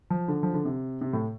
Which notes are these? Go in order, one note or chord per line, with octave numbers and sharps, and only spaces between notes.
F3
D3
F3
D3
C3
C3
A2